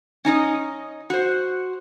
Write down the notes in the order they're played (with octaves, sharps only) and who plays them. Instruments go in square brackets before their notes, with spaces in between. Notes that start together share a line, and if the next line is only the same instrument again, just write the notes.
[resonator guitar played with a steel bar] C#4 D#4 D#5
F#4 C5